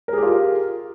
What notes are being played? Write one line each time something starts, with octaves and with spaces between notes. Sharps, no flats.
F4 G4 G#4 A#4 F5